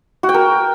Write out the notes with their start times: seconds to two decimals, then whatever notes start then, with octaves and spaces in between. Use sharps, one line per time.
0.23 F#4
0.29 G5
0.34 A#4